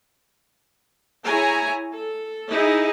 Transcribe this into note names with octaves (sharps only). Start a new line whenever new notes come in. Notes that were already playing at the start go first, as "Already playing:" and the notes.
E4 G#4 C#5 G#5 A#5
A4
D#4 E4 G#4